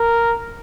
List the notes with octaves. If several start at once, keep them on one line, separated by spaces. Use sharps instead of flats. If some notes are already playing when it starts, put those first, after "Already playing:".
Already playing: A#4